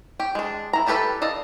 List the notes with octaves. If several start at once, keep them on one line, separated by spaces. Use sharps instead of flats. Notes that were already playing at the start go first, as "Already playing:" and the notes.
G4 G5
G#3 D4
E4 A#5
G3 E4 G4 A4 B4
A4 D5 D#5 F5